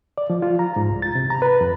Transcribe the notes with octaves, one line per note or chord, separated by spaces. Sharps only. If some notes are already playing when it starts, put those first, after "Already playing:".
D5
F3
F4
A#5
G#2
C2
A6
C3
A#5
B4
F2